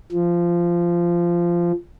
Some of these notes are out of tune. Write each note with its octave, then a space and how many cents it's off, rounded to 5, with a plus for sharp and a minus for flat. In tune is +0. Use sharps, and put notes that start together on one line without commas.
F3 -15